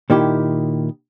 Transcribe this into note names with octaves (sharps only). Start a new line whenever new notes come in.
A#2 D#3 E4 G4